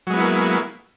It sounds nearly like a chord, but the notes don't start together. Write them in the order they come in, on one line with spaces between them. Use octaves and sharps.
F#3 G#3 B3 E4 A#3